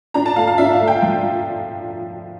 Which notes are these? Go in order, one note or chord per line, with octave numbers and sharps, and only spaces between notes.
D4 A#5
A5
A3 F5
F5
D4 E5
F5
A3
G5
F3